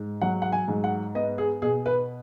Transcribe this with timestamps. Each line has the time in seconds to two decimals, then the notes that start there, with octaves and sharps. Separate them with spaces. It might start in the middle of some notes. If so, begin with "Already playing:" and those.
Already playing: G#2
0.21 F#3 F#5
0.42 F#5
0.52 G#5
0.68 G#2
0.84 F#5
1.15 B3 D#5
1.38 G#4
1.62 B2 G#4
1.86 B4